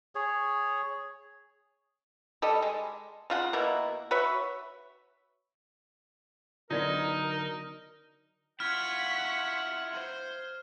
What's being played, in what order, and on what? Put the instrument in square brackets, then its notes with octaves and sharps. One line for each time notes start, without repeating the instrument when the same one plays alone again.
[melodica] G#4 C#5
[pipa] G3 A4 D#5
G#3
C#3 F4 F#5
B2 A#3 E4
F#4 B4 C#5 E5
[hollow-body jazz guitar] D3 F#3 B3 [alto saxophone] D#4 [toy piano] E4 D5 [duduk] A#4
[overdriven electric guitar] E4 F4 [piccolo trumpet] F#5 [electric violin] C#6 B6 [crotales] F6 G#6
[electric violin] C5